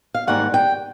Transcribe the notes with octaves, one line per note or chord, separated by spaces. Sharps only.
F5
G#2 D#3 G3 A#3 F#5
G5